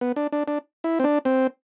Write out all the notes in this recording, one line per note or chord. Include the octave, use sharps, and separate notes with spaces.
B3
D4
D4
D4
E4
C4
D4
C4